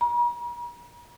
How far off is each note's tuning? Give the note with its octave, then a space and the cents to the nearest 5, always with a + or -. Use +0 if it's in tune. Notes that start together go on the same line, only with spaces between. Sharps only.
A#5 +45